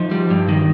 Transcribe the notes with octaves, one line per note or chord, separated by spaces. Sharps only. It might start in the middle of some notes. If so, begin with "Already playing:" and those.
Already playing: F3 D#4
G3
G2
D#3